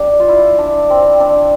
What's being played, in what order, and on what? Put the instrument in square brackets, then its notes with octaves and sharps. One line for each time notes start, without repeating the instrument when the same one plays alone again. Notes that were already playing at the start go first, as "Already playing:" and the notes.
Already playing: [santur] D4 G4
F4
E4
D4
C4
D4